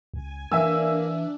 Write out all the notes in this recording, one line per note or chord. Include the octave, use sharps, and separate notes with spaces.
C#2 G#5
E3 A#3 D4 E5 G#5 E6